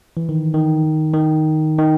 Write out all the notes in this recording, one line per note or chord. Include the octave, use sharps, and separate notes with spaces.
E3
D#3
D#3
D#3
D#3